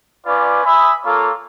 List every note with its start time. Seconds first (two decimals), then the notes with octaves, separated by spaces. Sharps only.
0.25 C#4 F4 B4 D5
0.64 E5 G#5 B5 D#6
1.04 A#3 F4 A4 C#5 D6